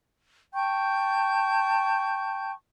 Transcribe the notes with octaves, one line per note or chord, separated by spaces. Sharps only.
G5 A5 C#6 G6